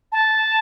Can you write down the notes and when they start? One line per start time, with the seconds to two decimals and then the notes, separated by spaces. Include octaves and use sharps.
0.12 A5